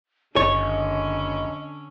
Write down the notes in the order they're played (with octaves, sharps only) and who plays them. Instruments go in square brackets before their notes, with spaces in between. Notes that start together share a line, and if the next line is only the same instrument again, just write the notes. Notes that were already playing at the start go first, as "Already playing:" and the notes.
[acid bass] F#1 [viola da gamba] D3 C#4 [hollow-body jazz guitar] C#5 [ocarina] D#5